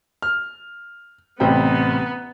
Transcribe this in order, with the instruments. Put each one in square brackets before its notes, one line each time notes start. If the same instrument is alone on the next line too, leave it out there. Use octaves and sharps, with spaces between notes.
[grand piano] F6
[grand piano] A1 C3 G5 [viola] B3